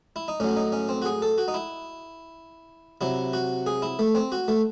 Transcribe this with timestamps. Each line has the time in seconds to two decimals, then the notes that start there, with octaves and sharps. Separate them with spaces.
0.16 E4
0.28 D#4
0.40 A2 F#3 C#4
0.56 D#4
0.72 C#4
0.89 C4
1.02 F#4
1.05 G#4
1.22 A4
1.38 F#4
1.48 D#4
1.54 E4
3.01 C3 F#3 E4
3.33 F#4
3.66 G#4
3.82 E4
3.99 A3
4.15 C4
4.32 F#4
4.48 A3